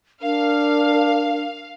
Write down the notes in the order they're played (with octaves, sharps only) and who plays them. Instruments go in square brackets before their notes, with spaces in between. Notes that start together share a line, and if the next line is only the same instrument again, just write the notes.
[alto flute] D4 [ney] A#4 [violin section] F5